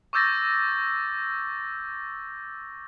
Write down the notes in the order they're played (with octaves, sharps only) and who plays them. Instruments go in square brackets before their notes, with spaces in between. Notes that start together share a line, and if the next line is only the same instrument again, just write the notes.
[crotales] C#6 D6 E6 G6 A6 A#6